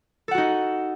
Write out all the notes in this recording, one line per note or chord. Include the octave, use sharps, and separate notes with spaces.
D#4 F#4 A4 F#5